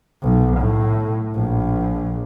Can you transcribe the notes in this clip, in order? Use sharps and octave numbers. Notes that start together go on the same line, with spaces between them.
B1
A2
A#1